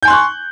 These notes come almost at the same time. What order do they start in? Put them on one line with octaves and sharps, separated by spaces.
G6 G#5 C6 F#6 C#6